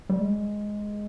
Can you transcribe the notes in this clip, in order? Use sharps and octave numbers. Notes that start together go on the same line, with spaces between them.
G3
G#3